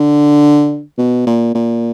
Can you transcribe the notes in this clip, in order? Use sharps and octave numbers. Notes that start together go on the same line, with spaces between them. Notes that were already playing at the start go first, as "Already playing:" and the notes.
Already playing: D3
B2
A#2
A#2